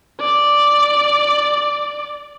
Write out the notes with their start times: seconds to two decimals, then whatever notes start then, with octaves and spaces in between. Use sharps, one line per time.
0.20 D5